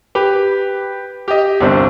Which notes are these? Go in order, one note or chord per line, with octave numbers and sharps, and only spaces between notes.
G4 B4
G4 D#5
G1 C2 C4 D4 C5